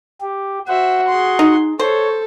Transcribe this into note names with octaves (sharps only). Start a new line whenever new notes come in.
G4
F#4 C5 E5 F#5
G#4 C6
D#4
A4 C5 C#5